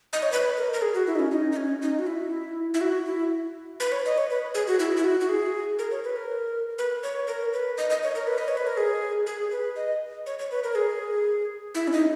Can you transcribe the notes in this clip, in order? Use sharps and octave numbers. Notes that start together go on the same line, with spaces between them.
D#5
C#5
B4
A#4
A#4
G#4
F#4
E4
D#4
C#4
D#4
D#4
C#4
D#4
F#4
E4
E4
F#4
E4
B4
C#5
D#5
C#5
B4
G#4
F#4
E4
E4
F#4
F#4
G#4
A#4
C#5
B4
A#4
B4
C#5
A#4
B4
D#5
D#5
C#5
A#4
B4
D#5
C#5
B4
A#4
G#4
G#4
B4
D#5
C#5
C#5
B4
A#4
G#4
E4
C#4
D#4